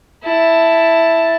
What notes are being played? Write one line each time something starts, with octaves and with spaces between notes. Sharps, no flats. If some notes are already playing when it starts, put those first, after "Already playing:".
E4 A5